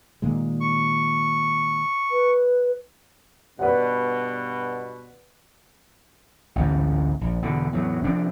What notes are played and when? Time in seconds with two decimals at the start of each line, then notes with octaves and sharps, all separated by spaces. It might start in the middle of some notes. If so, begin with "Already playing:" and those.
0.22 A#2 D#3 G#3
0.61 C#6
2.11 B4
3.59 G2 B2 B4 D5 F#5
6.56 A1 D2 G#2
7.21 A#1
7.42 E2 B2 D3
7.73 E2 A2 F#3
8.04 C3 F3 C4 D4